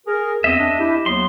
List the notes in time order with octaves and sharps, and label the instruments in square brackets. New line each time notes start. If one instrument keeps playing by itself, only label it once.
[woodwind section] G#4 A#4
[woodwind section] E2 G2 C4 [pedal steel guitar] D#5 E5
[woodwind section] D4
E4 G4
[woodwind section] D#2 F#3 B3 [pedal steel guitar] C6